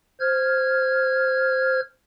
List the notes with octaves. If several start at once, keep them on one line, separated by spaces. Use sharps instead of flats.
C5 F6 G#6